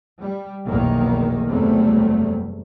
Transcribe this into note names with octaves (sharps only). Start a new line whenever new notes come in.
G3
F1 B1 E2 D#3 A#3
F#1 E2 C3 F#3 G3 A3